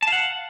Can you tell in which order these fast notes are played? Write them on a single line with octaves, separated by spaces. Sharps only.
A5 F5 F#5